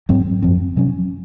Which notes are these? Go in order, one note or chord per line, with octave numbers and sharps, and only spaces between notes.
G#2 F#3 C4
F#2 F3 C4
C3 F#3 C#4